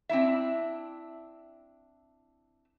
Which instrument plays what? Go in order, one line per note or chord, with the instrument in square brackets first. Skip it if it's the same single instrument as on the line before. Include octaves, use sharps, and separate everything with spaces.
[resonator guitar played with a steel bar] C4 D4 E4 E5